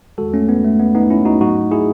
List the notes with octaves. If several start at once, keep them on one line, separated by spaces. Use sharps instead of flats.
E2 D#3 G#3 F#4 A4
A3 C#4
B3
A3
B3
B3 D#4
C#4 E4
D#4 F#4
G#2 F#3 A3 D#4 F#4
E4 G#4